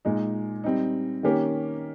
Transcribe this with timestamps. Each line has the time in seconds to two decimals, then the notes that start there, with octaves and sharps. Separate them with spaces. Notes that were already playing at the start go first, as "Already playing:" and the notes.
0.05 A#2 G#3 D#4
0.64 G3 C4 D#4
1.23 D#3 A#3 C#4 G4